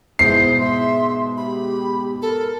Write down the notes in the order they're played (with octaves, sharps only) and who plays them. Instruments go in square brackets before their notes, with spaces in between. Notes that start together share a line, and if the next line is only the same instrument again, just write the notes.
[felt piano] G#2 B2 [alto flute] E4 [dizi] C5 [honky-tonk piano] C7
[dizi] E5 [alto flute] C6
[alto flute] G4 [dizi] B5
[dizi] A4 [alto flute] A#4